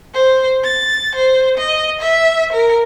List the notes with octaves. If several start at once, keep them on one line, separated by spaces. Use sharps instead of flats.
C5
A6
C5
D#5
E5
A#4